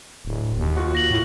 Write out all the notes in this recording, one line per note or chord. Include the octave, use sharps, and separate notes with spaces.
D1
D#2
F4 F#4 F#5
A#6 F#7
A2